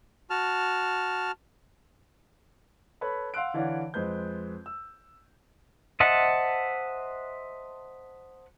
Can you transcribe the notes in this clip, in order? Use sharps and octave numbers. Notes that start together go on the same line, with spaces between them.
F#4 A5 F6
A4 B4 C#5 B5
F5 F#5 C6 E6 F#6 D7
D3 E3 C#5 D5 F5 F#5
F2 G#3 B4 C5 G6
E6
C5 D#5 E5 F#5 A5